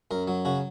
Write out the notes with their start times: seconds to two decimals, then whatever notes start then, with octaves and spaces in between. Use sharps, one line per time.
0.11 F#2 A#4
0.28 F#3
0.45 C#3 F#4